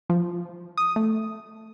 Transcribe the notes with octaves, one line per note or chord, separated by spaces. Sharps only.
F3
D#6
A3